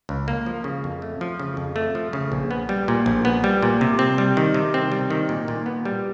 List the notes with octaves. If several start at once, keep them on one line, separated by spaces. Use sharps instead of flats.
C#2
A#3
F3
C#3
F2
A3
F3
C#3
F2
A3
F3
C#3
A#1
B3
G3
A#2
A#1
B3
G3
A#2
C3
C4
G3
D#3
C3
C4
G3
D#3
A#2
A#2
B3
G3